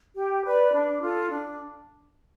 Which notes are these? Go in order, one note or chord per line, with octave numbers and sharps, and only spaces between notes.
G4
B4 D5
D4
F4 A4
D4